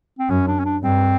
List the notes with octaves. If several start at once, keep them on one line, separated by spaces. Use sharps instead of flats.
C4
F#2 C#4
D4
C#4
D4
G2 C4